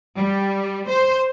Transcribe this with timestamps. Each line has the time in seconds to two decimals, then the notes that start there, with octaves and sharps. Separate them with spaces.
0.16 G3
0.88 C5